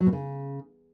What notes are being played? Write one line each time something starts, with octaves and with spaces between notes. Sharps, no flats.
F#3
B2
C#3